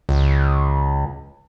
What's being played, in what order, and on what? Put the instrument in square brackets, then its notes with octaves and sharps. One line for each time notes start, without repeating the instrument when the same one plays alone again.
[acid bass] C#2